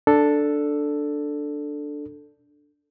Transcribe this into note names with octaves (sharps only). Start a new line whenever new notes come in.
D4 A4